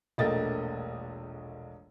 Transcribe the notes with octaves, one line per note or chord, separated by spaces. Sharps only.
E1 A#1 A3 A#3 D#5 A6